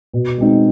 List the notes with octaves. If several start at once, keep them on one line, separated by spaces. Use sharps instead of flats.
B2
G#3 C4 D#4